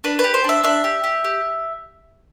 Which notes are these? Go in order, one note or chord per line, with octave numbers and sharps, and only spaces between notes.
D4 B4
B4
G4
C5
D4 E5
D4 E5
G4
G4
G4